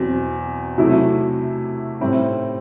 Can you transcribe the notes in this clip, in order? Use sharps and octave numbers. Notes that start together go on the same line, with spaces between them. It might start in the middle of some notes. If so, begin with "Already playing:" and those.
Already playing: E2 B2 F#3 C4
C3 F#3 A3 E4
A2 G3 C4 E4